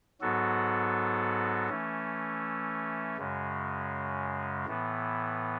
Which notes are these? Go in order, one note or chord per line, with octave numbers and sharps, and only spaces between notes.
G#2 F#3 B3 F#4 A4
E3 A3 C#4
F#2 C#3 G#3
A2 E3 B3